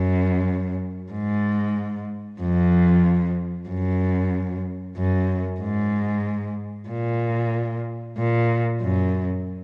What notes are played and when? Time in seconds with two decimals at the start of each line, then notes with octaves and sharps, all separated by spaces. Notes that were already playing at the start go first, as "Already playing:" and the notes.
Already playing: F#2
1.12 G#2
2.40 F2
3.68 F#2
4.97 F#2
5.61 G#2
6.89 A#2
8.17 A#2
8.81 F#2